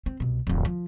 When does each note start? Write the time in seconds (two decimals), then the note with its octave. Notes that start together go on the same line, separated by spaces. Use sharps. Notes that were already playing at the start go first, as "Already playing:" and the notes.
0.06 C4
0.20 C2 B2
0.47 D1 F2
0.65 F3